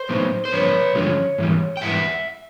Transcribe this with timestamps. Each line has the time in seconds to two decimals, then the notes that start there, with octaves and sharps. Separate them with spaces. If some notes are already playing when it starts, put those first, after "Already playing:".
Already playing: C5
0.09 A2 F#3 B3 D#4
0.45 C5
0.52 G2 D3 F3 B4 C#5
0.95 G2 D3 F3 G#3 C#4
1.38 G#2 E3 G3
1.77 G5
1.81 G#2 E3 G3 E5 F#5